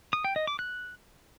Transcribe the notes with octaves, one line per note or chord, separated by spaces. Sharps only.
D#6
G5
D#5
D6
F#6